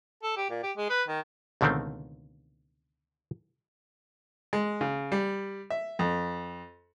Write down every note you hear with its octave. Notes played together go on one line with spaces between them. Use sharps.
A4
G4
A#2
G4
G#3
B4
D#3
C#2 B2 D3 D#3 A3 C4
G#3
C#3
G3
E5
F2